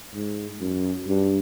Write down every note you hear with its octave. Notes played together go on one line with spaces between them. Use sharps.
G#2
F#2
G2